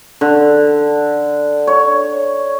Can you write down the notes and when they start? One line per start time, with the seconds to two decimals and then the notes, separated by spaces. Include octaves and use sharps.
0.21 D3
1.67 C#5